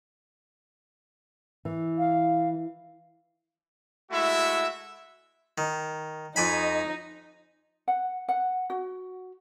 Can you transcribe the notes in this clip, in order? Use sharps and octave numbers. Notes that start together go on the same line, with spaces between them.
E3
F5
G#3 A3 E4 F#4 E5
D#3
F2 D#4 D#5 G#5 B5
F#5
F#5
F#4